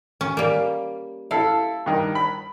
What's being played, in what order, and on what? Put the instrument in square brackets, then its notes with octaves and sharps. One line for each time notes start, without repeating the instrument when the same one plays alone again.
[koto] C#4
G3 A#3
[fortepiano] E4 A4 [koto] F5
[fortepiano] G2 D#3
B5